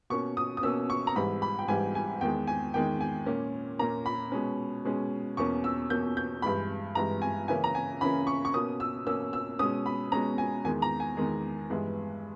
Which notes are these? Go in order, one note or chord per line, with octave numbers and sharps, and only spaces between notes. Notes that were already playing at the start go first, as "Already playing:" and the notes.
B2 A#3 C#4 C#6
D#6
D#6
B2 A#3 C#4 E6
C#6
A#5
G#2 E3 G3 B5
B5
G5
G#2 E3 G3 G#5
G#5
E2 D#3 G#3 G5
G#5
E2 D#3 G#3 G5
G#5
A#2 A#3 C#4
A#2 A#3 C#4 A#5
B5
B2 G#3 C#4
B2 G#3 C#4
E2 B2 A#3 C#4 C#6
E6
E2 B2 A#3 C#4 G6
G6
G2 E3 G#3 B5
G2 E3 G#3 A#5
G#5
C#3 E3 A#3 C#4 G#5
A#5
G#5
C#3 E3 A#3 C#4 B5
C#6
C#6
B2 A#3 C#4 D#6
E6
B2 A#3 C#4 E6
E6
B2 G#3 C#4 D#6
B5
B2 G#3 C#4 A#5
G#5
E2 D#3 G#3 G#5
A#5
G#5
E2 D#3 G#3
G2 E3 G#3 B3